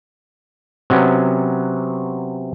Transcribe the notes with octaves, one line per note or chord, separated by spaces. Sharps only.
C3 F#3 B3 C#4